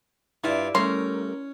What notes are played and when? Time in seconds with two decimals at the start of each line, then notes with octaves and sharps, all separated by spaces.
0.44 G2 E4 F4 D5
0.75 G3 A3 C#4 A#4 C6